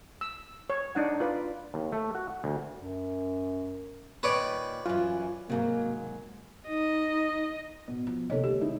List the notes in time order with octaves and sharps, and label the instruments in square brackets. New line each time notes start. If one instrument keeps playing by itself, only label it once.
[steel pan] E6
C#5
D4 D#4 F#5
F4 B4 D5
[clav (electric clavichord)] D#2
A3
F#4
F#5
D2
[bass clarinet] F#2
[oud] A#2 D#3 [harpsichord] B4 C#5 D5
[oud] F#2 E3 [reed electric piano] F4
[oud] G#2 F#3 [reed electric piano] C3 [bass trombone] A#3
[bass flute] D#4 [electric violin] D#5
[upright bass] A1 [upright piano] B2
[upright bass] F3
[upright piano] D#2 [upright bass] C3 D#3 [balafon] A4 C#5 D#5
[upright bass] D3 G#3 [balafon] G4
[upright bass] C2 [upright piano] G#3 D#4 E4